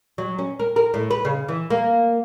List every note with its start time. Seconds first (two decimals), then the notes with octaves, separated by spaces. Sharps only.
0.18 F#3
0.39 C#4
0.59 A#4
0.76 A#4
0.94 A2
1.11 B4
1.25 C#3
1.48 E3
1.70 A#3